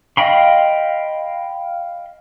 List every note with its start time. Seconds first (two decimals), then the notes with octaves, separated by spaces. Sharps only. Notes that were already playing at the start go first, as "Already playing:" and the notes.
0.17 D#5 F5 G5 B5 C6